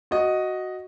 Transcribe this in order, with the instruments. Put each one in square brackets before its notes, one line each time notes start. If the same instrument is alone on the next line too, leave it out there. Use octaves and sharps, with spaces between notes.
[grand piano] F#4 D#5